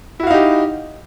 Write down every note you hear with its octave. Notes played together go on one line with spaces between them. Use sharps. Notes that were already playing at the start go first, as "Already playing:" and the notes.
D#4 E4 F#4 G4 F5